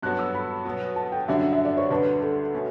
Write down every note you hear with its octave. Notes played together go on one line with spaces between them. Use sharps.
G2 F#3 B3 F#4 F#6
E6
B5
B2 F#3 B3
A5
G5
F#2 D3 G3 D4 F#4 E5
E5
D5
C#5
D2 D3 G3 D4 B4
A4
B2 A3 C#4